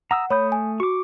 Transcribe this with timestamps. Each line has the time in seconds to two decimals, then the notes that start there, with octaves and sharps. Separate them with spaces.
0.11 F#5 A#5 D#6 E6
0.30 A3 C#5 B5 D#6 G6
0.52 G#5
0.80 F#4 C#6 D6